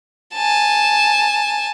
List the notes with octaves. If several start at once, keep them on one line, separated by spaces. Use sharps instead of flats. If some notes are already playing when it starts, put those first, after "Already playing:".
G#5 A5